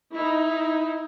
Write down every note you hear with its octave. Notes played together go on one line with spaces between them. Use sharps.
D#4 E4